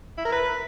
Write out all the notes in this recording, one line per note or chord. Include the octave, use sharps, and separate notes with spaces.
E4
A#4
B4